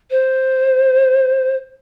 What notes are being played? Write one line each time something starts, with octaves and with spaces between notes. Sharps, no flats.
C5